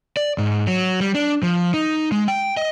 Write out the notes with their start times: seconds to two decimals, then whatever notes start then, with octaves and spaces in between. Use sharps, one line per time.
0.17 D5
0.38 G#2
0.67 F#3
1.00 G3
1.15 D4
1.43 F3
1.74 D#4
2.12 G#3
2.28 G5
2.57 D#5